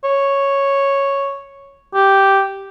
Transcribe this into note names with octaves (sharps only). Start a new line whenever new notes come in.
C#5
G4